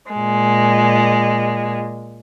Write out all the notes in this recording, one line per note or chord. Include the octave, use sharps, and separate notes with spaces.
A#2 G#3